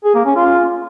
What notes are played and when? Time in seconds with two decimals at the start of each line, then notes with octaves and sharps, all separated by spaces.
0.05 G#4
0.15 A#3
0.26 C#4
0.36 F4